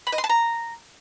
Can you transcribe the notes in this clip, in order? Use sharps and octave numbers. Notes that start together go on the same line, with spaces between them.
B5
D#5
C6
A5
A#5